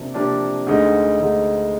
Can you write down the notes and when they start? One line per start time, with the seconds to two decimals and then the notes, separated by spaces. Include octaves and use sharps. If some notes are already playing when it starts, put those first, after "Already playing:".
Already playing: C3 F3 A#3 D4 G4
0.14 C3 F3 A#3 D4 G4
0.66 D2 D3 G#3 D#4
1.20 D2 D3 G#3 D#4